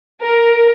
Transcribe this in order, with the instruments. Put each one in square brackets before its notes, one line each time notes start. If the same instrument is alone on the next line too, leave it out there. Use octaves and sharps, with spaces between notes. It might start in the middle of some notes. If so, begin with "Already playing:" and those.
[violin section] A#4